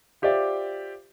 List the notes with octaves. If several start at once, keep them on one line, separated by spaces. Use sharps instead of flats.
F4 G4 C5 D5 E5